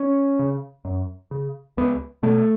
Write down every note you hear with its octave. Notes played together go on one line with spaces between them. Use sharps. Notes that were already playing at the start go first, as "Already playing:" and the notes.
Already playing: C#4
C#3
F#2
C#3
C#2 B3
B2 A3